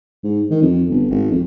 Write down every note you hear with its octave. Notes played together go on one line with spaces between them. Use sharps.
G#2
D#3
F2
G1
G#1
F2